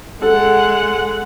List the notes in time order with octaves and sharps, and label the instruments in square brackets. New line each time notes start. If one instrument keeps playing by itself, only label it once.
[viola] G#3 F#5 [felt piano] A4